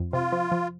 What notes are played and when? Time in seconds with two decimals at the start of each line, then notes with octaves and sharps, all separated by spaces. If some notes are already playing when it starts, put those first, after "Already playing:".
Already playing: F2
0.13 C3 F4
0.32 F3
0.52 F3